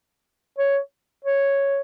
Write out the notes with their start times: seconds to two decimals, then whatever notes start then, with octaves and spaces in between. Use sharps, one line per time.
0.59 C#5
1.25 C#5